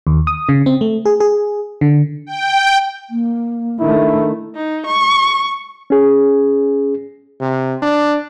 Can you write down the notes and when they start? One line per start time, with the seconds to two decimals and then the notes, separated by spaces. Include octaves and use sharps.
0.07 D#2
0.27 D#6
0.49 C#3
0.66 C4
0.81 A3
1.05 G#4
1.20 G#4
1.81 D3
2.26 G5
3.10 A#3
3.80 D#3 A3 D4 E4
4.56 D#4
4.87 C#6
5.90 C#4 G#4
7.41 C3
7.82 D4